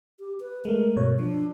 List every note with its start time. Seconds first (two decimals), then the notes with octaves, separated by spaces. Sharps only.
0.20 G4
0.40 B4
0.65 G#3 A3 A#4
0.96 G2 B2 C#5
1.19 F3 D4